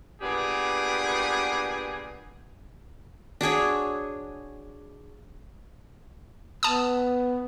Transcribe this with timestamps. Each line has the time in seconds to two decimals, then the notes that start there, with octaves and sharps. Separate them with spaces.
0.21 A#2 B3 D4 G4 G#4
3.41 D4 F#4 G#4 C#5
6.63 B3 A5 D#6